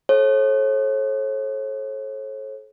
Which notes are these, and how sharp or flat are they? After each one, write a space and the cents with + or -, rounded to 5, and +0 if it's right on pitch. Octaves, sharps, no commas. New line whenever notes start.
A4 -30 C#5 -45